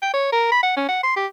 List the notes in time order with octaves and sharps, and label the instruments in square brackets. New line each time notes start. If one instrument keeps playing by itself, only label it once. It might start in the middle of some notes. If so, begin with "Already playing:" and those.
[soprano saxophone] G5
C#5
A#4
B5
F#5
C#4
F#5
C6
G4